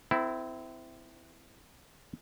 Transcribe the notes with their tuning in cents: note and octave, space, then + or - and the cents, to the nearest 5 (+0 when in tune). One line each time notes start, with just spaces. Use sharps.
C4 -30 E4 +0 A4 +20